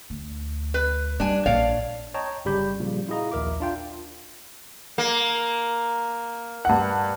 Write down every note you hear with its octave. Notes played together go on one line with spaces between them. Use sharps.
D2
B4
G3 D4 G#5
A#1 C#5 D5 F5
C#5 D#5 G5 A5 A#5
G1 C#3 G3 G4 B5 G6
A#2 C#3 F3 G3
E4 F#4 G#4 D#5 F5 A#5
A#1 D#2 A#4 E5 D6
D4 F4 G5
A#3
G2 F#5